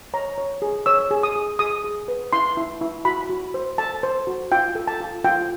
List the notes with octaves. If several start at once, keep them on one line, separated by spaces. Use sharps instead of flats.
C#5 A#5
C#5
G#4
C#5 E6
G#4
D#6
G#4
G#4 D#6
G#4
B4
E4 C6
E4
E4
F#4 B5
F#4
C5
A4 A5
C5
F#4
F4 G5
A4
A5
F4
F4 G5